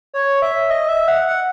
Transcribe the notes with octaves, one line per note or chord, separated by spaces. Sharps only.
C#5
E5
D#5
E5
F#5
F#5